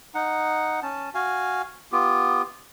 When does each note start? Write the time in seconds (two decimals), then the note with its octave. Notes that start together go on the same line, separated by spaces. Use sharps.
0.15 D#4 F#5
0.82 C#4 A5
1.14 F#4 F5 G#5
1.92 B3 F4 G4